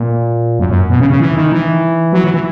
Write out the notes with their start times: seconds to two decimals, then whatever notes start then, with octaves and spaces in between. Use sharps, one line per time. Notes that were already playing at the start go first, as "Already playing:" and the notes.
Already playing: A#2
0.59 F#2
0.69 F#2
0.90 B2
1.00 C#3
1.10 C#3
1.20 E3
1.36 D#3
1.52 E3
2.13 F#3
2.24 E3
2.34 E3